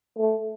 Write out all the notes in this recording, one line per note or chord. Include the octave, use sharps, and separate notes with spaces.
A3